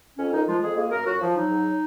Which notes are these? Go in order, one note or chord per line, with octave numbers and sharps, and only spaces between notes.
F2 C#4
D#3 D#4
F3 G#3 F4
F2 G#3 G#4
G#3 A#3 G#4
F#2 A#3 A#4
F#2 F#3 F#4
F3
F#3 D#4
G#2